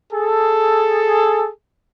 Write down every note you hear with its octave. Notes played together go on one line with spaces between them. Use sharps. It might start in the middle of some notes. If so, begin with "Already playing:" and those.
G#4 A4